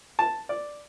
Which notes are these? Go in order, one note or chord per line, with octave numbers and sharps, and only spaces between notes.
A5
D5